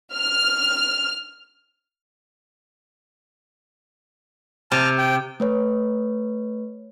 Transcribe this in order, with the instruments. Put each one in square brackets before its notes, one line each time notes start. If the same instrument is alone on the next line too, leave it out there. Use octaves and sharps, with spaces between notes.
[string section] F6
[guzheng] C3 [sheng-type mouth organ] A5 F6
[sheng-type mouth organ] G5
[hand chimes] A3 B4 C#5